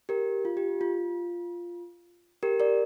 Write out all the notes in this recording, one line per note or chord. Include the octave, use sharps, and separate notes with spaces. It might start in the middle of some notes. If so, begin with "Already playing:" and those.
G4 A#4
F4
G4
F4
G4 A#4
A#4 D5